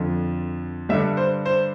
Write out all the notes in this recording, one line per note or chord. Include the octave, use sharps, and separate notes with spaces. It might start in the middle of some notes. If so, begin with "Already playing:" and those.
Already playing: F2 D3 F3
G2 D3 G3 E5
C5
C5